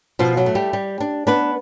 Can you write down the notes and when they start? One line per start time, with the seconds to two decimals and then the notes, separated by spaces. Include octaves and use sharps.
0.19 B2 F3 F4
0.37 F#3 F#4
0.46 A3
0.55 G3 G4
0.73 G3
1.00 D4
1.27 B3 D4 B4